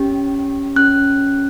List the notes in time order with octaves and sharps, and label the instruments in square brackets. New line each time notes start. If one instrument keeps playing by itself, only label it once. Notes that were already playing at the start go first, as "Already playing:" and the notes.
Already playing: [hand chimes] C#4 G4
C#4 G4 F#6